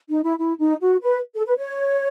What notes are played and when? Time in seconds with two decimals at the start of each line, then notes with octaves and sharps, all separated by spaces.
0.09 D#4
0.23 E4
0.38 E4
0.59 D#4
0.81 F#4
1.02 B4
1.35 A4
1.46 B4
1.57 C#5